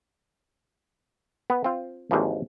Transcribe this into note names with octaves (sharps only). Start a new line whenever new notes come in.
B3
C4 F4
G#1 D#2 E3 F3